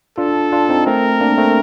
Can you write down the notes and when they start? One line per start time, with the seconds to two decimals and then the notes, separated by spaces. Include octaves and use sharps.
0.18 D4 F4 A4
0.52 D4 F4
0.69 C4 D#4
0.86 A3 C4 A#4
1.21 A#3 D4
1.37 A3 C4